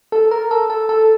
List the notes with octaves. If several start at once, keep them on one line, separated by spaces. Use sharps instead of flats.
A4
A#4
A4
A4
A4